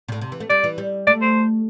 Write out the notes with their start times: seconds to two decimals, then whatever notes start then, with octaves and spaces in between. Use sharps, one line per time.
0.08 C3
0.12 A2
0.21 C3
0.32 E3
0.40 A3
0.50 G3 D5
0.64 E3
0.78 G3
1.07 A3 D5
1.22 C5